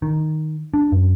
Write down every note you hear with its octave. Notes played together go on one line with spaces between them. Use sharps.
D#3
D4
F#2